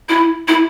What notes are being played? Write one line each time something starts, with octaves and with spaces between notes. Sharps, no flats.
E4
E4